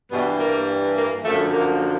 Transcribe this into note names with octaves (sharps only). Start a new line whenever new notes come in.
G2 B2 E3 G3 B3
A#3
A#3
F#2 D3 F3 A3
A#3